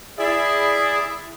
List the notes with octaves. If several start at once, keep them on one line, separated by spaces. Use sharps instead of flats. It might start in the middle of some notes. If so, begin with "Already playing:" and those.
E4 G#4 D5